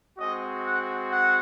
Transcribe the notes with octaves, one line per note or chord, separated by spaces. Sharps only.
G#3 C4 F#4 D#5
F#5
F#5